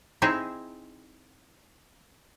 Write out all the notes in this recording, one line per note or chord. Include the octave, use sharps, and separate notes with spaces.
C4 D#4 E4 G#4